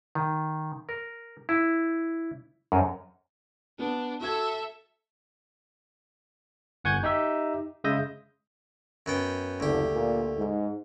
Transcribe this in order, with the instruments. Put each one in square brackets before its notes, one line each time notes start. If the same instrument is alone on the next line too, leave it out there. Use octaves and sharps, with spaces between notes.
[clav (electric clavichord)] D#3
A#4
E4
F#2
[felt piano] B3 [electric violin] D4
[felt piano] F#4 G#6 [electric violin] A4 E5
[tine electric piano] G1 F#5 G#5 C#6 G6 G#6
D#4 G4 E5
C#3 G#3 E5 D#6 G6 A#6
[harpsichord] F#2 B3 G5
[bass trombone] F#1 [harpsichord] D2 G4
[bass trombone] A#2
G#2